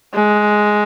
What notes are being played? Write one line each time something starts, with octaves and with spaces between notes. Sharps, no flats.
G#3